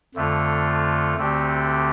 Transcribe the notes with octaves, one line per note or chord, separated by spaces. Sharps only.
F2 D3 A3 F4
D2 D3 A3 C4 G4